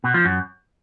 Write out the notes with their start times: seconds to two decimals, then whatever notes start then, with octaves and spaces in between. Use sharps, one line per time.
0.04 B2
0.14 F3
0.25 F#2